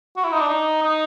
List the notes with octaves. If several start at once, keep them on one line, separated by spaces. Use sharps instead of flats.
F#4
E4
D#4
D4
D#4
D#4